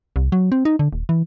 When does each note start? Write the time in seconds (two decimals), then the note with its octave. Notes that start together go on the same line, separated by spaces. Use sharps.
0.16 C2
0.32 F#3
0.52 C4
0.65 D#4
0.79 D3
0.93 D#1
1.09 E3